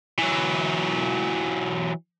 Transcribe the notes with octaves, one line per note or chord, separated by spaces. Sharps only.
E3 F#3